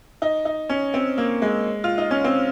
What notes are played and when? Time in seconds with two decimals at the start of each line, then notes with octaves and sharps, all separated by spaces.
0.22 D#4
0.45 D#4
0.69 C#4
0.94 C4
1.18 A#3
1.42 G#3
1.84 F4
1.98 D#4
2.11 C#4
2.24 C4